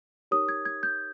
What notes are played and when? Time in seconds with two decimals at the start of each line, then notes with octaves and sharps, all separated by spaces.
0.31 D#4 G4 A#4 C#5 D#6
0.49 G#6
0.65 G#6
0.83 G6